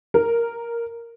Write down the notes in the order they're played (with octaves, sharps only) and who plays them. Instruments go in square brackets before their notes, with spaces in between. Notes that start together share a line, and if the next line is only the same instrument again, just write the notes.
[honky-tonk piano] A#4